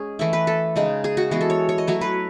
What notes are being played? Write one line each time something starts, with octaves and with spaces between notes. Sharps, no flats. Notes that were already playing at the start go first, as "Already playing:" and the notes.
Already playing: G#3 C#4 G#4
E3 A3 E4
B4
A4
C#3 G#3 D#4
G#4
F#4
E3 G#3 B3 G#4
A4
C#5
C#5
D#5
F#3 A3 E4 C#5
B4